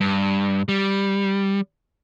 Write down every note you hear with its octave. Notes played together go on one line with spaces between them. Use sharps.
G2
G3